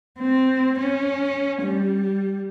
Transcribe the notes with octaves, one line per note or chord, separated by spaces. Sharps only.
C4
C#4
G3